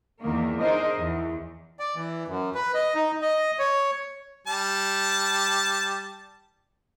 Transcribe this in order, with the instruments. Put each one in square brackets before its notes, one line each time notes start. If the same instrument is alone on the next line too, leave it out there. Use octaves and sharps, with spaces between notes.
[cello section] E2 D#3 A#3
D4 D#4 G#4 A#4 C5 D#5
E2
[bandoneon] D5
E3
F#2
B4
D#5
D#4
D#5
C#5
[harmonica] G3 A5